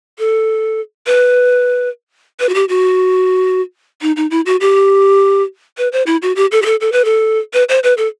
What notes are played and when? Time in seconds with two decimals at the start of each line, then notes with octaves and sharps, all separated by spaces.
0.19 A4
1.07 B4
2.40 B4
2.49 F#4
2.55 G4
2.69 F#4
4.02 D#4
4.16 D#4
4.31 E4
4.46 F#4
4.61 G4
5.78 B4
5.93 C5
6.06 E4
6.22 F#4
6.36 G4
6.52 A4
6.62 G4
6.66 A4
6.81 A4
6.92 B4
7.05 A4
7.54 B4
7.69 C5
7.84 B4
7.97 A4